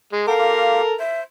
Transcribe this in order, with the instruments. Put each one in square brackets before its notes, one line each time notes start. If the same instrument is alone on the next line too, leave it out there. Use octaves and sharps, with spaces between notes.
[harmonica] G#3
[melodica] B3 G5 D6 [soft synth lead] A4 [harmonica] A#4 [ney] F5
[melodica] A#3 F4 G4
[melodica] C5 [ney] E5